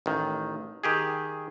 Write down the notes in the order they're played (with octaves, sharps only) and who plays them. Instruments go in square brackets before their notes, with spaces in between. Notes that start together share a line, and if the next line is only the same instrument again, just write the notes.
[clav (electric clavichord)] A1 D#3
D#3 G4 G#4